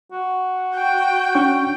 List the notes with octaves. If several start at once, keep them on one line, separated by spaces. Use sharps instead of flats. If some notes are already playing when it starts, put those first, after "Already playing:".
F#4
G5
C#4 D4 C#6